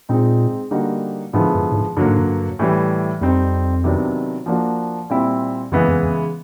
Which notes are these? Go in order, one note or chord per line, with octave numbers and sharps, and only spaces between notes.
A#2 G#3 C4 D#4
D3 G3 A#3 D#4 F#4
G#2 D3 F3 G#3 B3 E4
G2
A2
G#2
G2 D3 F#3 A#3
G#2
G2
A2 E3 G3
F2 G3 C4 D#4
C3 D#3 F#3 B3 D4
F3 A#3 D4 F#4
A#2 G3 C4 E4
F#2 C#3 E3 G#3 B3 E4
F2
E2